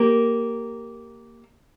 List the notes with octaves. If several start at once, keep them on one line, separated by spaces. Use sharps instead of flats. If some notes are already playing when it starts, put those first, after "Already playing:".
Already playing: A#3 G4